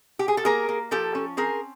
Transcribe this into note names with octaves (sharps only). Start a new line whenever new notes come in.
G4
G#4
A4
A#3 G#4 A#4
A#3
F3 G4 A4
C#4
C4 G#4 A#4